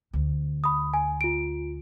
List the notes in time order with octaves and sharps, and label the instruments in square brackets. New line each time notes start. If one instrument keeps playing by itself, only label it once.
[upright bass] D2
[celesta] B5 D#6
G#5
F4 D7